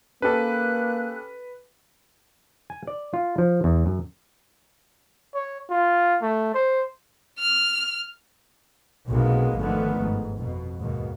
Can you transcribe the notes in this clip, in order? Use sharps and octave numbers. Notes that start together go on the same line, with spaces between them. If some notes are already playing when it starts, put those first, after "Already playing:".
A#3 C#4 G4 A4 B4 F#6
G#5
D5
F4
F3
E2
F#2
C#5
F4
A3
C5
F6
B1 A2 C3 G#3 A#3 B3
G#1 D3 D#3 F3 A3 B3
G1 G#2
F2 B2
D#2 G#2 B2 D#3